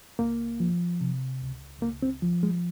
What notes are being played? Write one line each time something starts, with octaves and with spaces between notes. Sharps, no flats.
C#2 A#3
F3
C3
C#2
C#2 A#3
C4
F3
G#3